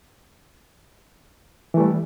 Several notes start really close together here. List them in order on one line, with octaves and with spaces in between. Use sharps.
E3 A3 G3